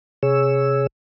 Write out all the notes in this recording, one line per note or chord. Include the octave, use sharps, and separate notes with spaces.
C3 G#4 C#5 E6